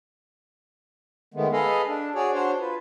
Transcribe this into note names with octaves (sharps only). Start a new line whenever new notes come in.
D#3 G#3 A3 B3
G#4 A4 B4 D#5 F5
D4
F#4 G#4 C#5 D5
D4 F#4 C5 C#5
F4 B4